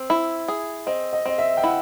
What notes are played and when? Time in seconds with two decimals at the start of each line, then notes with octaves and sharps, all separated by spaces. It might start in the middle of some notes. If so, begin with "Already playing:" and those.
Already playing: C4
0.10 E4
0.48 G#4
0.86 C4 D#5
1.13 D#5
1.25 C4 D#5
1.38 E5
1.57 G5
1.63 E4 F#5